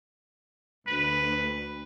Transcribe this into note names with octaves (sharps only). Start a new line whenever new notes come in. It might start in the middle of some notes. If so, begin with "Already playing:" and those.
D2 B4